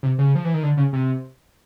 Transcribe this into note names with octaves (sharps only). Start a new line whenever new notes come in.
C3
C#3
F3
E3
D#3
D3
C#3
C3